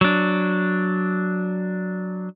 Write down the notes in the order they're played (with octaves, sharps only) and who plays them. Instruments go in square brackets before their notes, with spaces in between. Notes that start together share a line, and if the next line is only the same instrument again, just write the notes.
[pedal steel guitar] F#3 D4